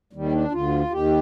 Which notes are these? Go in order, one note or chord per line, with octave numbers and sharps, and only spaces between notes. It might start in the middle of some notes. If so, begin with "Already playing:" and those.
D#2 D#3 G3
D4
D2 D3 F4
D#2 D#3 G4